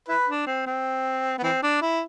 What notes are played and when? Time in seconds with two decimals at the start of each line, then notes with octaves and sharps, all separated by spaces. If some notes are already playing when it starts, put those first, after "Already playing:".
0.08 E4 B4
0.28 D4
0.47 C4
0.66 C4
1.38 B3
1.43 E3 C4
1.63 D4
1.81 E4